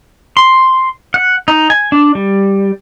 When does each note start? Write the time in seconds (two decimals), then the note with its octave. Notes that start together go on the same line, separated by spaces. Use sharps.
0.37 C6
1.14 F#5
1.48 D#4
1.70 G#5
1.92 D4
2.15 G3